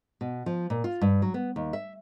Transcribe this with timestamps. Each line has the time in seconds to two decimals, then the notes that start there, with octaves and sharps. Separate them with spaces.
0.21 B2
0.46 F3
0.70 A#2
0.84 F4
1.01 G2
1.22 F#3
1.34 B3
1.56 D#2
1.73 E5